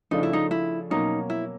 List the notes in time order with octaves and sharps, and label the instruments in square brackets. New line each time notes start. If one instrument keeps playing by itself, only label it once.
[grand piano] C#3 F3 A3 D4 F4 [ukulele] D#4
[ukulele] E4
D#4
E4
[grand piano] B2 F#3 A#3 C#4 [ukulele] D#4
[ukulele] E4